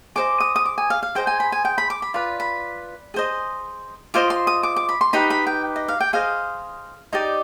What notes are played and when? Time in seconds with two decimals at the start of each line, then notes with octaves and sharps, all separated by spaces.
0.16 G#4 C5 D#5 D6
0.40 D#6
0.56 D#6
0.65 D6
0.78 G#5
0.90 F5
1.03 F5
1.15 G#4 C5 D#5 G5
1.27 G#5
1.40 B5
1.52 G#5
1.65 G5
1.78 B5
1.90 D6
2.02 B5
2.14 F4 B4 D5 B5
2.40 B5
3.14 G#4 C5 D#5
4.14 F4 C5 D#5 D6
4.30 C6
4.47 D#6
4.63 D6
4.76 D6
4.89 B5
5.01 C6
5.13 D#4 G4 B4 B5
5.30 B5
5.47 G5
5.76 D#5
5.88 F5
6.00 G5
6.13 G#4 C5 D#5 F5
7.13 D#4 G4 D5 D#5